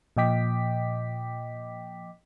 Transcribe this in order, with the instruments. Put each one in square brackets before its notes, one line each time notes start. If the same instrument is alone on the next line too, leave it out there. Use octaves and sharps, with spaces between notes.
[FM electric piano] A#2 F3 D#5 G5 D6 B6